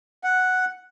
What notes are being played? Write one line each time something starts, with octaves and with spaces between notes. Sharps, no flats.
F#5